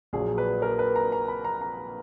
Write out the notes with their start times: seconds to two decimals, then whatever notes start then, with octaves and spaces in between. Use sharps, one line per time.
0.13 A#1 A#2 F#3 G#4
0.38 B4
0.62 A#4
0.79 B4
0.96 A#5
1.12 A#5
1.28 B5
1.45 A#5
1.61 A#5